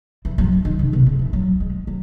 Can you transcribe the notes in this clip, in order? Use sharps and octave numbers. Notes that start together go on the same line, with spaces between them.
E3
F#3
E3
D#3
C#3
B2
C#3
E3
F#3
G#3
F#3